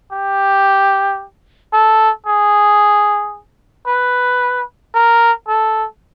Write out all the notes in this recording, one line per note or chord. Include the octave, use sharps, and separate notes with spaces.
G4
A4
G#4
B4
A#4
A4